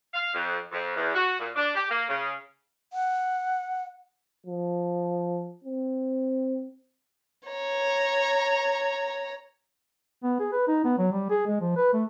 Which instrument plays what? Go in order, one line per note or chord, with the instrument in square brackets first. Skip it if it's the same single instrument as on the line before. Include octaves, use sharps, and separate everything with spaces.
[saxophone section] F5
F2
F2
E2
F#4
A#2
D4
G4
A#3
C#3
[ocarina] F#5
[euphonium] F3
C4
[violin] C#5 A#5
[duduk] B3
G#4
B4
D#4
B3
F#3
G3
G#4
G#3
F3
B4
A3